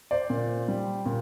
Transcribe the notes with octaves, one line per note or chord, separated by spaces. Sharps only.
C5 D5
A#2
G3
A#2